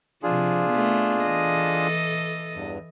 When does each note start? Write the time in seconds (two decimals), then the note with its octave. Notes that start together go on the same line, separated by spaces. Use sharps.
0.23 C3 F3 D4 F4 G#4
0.70 A3 B3
1.24 E3 A4 D#5
2.55 E2 G2